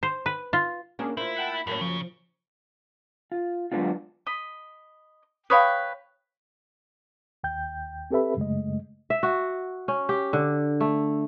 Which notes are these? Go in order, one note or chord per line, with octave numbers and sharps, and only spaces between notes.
C5
B4
F4
A#3 C#4 D4 F#4 G#4
A#3 E4 F4 C5
F#5 G5 A5
B5
F#2 A2 A#3 C#4
C#3 F3
F4
F#3 G#3 A#3 B3 D4 F4
D#5 B5
B4 C#5 F5 G5 B5 D#6
D#2 G5 G6
C4 G4 A4 B4 E5 B5
F#2 C#3 G#3 A3 D#5
E5
F#4
C#4
G4
D3
A3